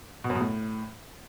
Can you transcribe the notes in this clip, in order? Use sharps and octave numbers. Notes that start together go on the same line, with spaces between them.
B2
F#2
B2
A2